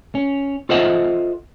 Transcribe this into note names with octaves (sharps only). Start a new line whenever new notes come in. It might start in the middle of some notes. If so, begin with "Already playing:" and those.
C#4
F4 A4 C5 D#5 E5 F#5